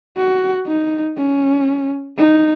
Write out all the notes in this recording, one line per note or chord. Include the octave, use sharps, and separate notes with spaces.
F#4
D#4
C#4
D#4